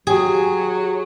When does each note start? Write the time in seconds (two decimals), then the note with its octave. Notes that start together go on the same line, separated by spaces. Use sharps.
0.07 F#3 G4 G#4